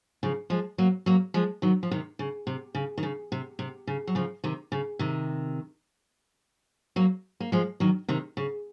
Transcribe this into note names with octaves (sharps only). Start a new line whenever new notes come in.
C#3 F3
F3 G#3
F#3 A#3
F#3 A#3
F3 G#3
D#3 F#3
F3
C3 D#3
C#3
C3
C#3
D#3
C#3
C3
C3
C#3
F#3
C#3 F3
C3 D#3
C#3
C3 D#3
F#3 A#3
A#3
F3 G#3
D#3 F#3
C3 D#3
C#3